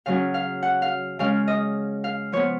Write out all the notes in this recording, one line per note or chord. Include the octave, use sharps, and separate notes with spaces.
C#3 F#3 C#4 F5
F5
F#5
F5
C#3 G#3 C#4 F5
D#5
F5
F3 B3 C#5